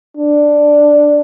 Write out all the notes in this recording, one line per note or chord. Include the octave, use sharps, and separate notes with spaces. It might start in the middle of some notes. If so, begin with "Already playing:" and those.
D4